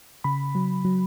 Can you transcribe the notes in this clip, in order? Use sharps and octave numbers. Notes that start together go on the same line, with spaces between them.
C#3 B5
F#3
F#3